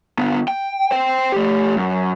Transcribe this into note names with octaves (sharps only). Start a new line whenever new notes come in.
D3 B3
G5
C5 G5
A3 G4
F#2